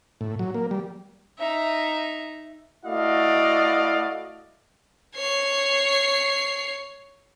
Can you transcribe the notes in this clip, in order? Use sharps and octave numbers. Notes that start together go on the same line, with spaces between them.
A2
F#3
A#3
G3
D#4 E5
A3 E4 F#4 D5 D#5 F5
C#5 C7